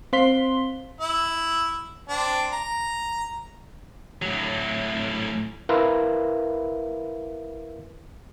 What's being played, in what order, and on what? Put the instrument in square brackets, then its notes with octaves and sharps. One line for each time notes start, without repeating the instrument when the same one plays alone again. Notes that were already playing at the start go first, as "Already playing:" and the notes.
[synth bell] C4 C5 F5 C6 B6 G7
[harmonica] E4
C4 D4
A#5
[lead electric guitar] A2 F#3
[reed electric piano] E4 A#4 B4 E5 F5 C6